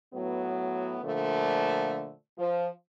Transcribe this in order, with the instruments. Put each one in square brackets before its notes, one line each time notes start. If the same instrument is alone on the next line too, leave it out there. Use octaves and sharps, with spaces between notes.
[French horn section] A2 F#3 B3
A#2 D3 F3 A3
F3